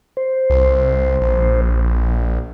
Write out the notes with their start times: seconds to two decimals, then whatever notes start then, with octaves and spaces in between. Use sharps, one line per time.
0.17 C5
0.50 C2
1.21 A#1